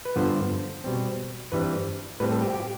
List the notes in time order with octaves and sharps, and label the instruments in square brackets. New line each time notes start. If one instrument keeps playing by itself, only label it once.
[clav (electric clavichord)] B4
G2 D3 F3 B3 C5
B2 G3 C4
G2 E3 G3 C4 B4
A2 G3 C4 B4
A4
G4
G4